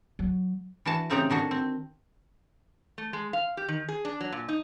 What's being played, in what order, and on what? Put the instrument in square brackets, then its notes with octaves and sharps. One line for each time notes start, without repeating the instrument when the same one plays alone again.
[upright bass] F#3
[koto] E3 D4 F#4 A5
A2 C#3 C4 D#4 G4 A#5
D3 D#3 D4 F#4
C4
[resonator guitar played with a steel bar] A3
G#3
F5
G4
D#3
G#4
D4
F#3
A#2
D#4